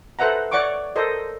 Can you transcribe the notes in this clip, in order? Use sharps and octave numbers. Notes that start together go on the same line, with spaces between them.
A4 B4 C5 E5 F#5 A#5
C#5 D5 F#5 C#6 D6
A4 A#4 C5 D#5